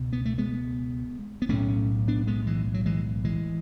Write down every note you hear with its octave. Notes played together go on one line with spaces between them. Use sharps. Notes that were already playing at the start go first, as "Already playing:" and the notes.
Already playing: C#2 B2
B3
A3
G#3 B3
B3
B1 A2 A3 C#4
B3 D4
G#3 B3
E3 G#3
F#3
E3 G#3
E3 G#3